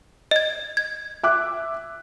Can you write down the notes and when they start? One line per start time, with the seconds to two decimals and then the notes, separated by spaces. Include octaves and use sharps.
0.31 D#5 G#6
0.77 G#6
1.23 E5 D6 F#6